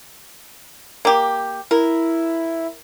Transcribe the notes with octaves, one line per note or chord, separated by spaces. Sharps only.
A#3 G4
E4 A#4